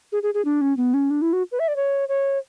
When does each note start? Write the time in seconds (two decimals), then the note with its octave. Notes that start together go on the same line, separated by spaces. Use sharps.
0.12 G#4
0.23 G#4
0.34 G#4
0.45 D4
0.61 C#4
0.77 B3
0.94 C#4
1.10 D4
1.22 E4
1.33 F#4
1.52 B4
1.59 E5
1.68 D5
1.76 C#5
2.08 C#5